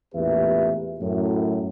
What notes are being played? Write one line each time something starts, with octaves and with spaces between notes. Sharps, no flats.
A1 E2 A#2 G4 B4 E5
F#2 A2